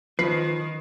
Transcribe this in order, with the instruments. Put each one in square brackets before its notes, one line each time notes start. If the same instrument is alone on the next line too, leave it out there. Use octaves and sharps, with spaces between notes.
[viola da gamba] D#3 [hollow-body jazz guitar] F3 [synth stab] B4 [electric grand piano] C7